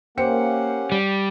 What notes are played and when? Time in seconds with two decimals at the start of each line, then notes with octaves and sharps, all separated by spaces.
0.18 A#3 C#4 G4 C5 F#5 G5 C#7
0.92 G3